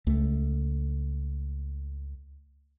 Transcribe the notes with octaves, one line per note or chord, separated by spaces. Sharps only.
C#2 A3